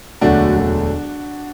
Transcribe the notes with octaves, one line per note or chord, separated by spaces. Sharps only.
E1 D2 D3 F#3 A3 D4 F#4
E1 D2 D3 F#3 A3